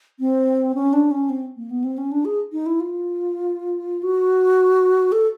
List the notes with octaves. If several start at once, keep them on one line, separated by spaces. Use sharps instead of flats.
C4
C#4
D4
C#4
C4
A#3
B3
C4
C#4
D4
G#4
D#4
E4
F4
F#4
A4